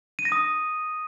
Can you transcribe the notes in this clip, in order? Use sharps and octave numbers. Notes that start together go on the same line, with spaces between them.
D#7
A#6
D#6